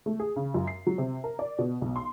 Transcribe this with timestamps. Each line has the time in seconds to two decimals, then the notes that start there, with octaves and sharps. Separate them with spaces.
0.06 A3
0.20 G#4
0.36 C#3
0.54 F#2
0.67 C7
0.87 F#3
0.98 C3
1.24 A#4
1.39 D5
1.59 B2
1.81 B1
1.96 C6